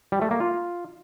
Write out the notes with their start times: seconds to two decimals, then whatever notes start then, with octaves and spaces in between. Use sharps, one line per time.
0.12 G3
0.22 A3
0.31 A#3
0.40 F4